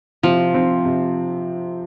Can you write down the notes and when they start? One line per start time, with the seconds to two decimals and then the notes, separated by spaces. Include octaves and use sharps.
0.23 C3 F3
0.54 C4
0.85 C3